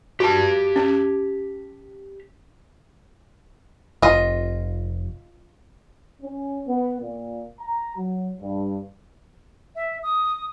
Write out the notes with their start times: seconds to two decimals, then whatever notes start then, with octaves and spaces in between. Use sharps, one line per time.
0.20 F#4 G4 A5
0.76 C#4
4.02 F1 F4 D#5
6.22 C#4
6.68 B3
7.01 A#2
7.59 A#5
7.96 F#3
8.40 G2
9.76 E5
10.03 D#6